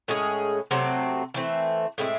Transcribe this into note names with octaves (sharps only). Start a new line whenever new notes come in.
A2 G#3 C#4 G#4
C3 F#3 A3 C4
E3 A3 C4
A2 G#3 C4 E4